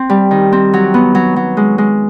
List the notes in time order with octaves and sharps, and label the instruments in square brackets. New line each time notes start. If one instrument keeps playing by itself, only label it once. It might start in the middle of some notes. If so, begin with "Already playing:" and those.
Already playing: [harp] C4
G3
D#3
C4
F#3
B3
F#3
F#3
G#3
G#3